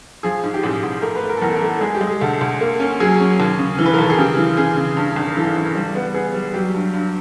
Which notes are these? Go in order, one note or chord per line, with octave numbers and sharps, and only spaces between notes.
F3 G#4
G#2
G4
A1 G#4
A1
A3 A#4
B4
A3
A#4
A4
E2 A#4
A#4
A3
A4
G#3 G#4
G4
G#3
G#4
D2 A4
D2
A#3
C#4
F#3 G#4
C#4
D#2
C#3
E3
B4
A#4
D#2 A4
G#4
C#3 G4
E3
C#3 G#4
C#3
G2
G#1
E3 A4
E3
G3
B3
B3 G#4
G3
F#3 G4
G2
G2